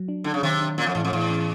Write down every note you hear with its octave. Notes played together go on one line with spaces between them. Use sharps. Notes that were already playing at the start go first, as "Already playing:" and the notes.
Already playing: F#3
D4
D3 D4
C#3
C3 D#3
D4
A#2 C#4
F2
E2 A2
F2
E2 A2
C#4